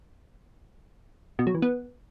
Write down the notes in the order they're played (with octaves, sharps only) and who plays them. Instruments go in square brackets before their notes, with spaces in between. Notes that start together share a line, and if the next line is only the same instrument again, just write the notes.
[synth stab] B2
F#3
E3
B3